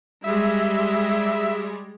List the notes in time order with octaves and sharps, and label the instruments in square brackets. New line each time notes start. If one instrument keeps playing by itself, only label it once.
[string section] G3 G#3 [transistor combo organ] E5